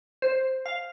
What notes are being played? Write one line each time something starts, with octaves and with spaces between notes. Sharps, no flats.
C5
F5